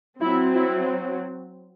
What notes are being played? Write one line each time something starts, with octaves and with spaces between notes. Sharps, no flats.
F#3 C4 E4
E4